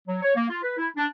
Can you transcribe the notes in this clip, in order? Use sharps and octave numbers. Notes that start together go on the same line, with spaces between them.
F#3
C#5
A#3
F4
B4
E4
D4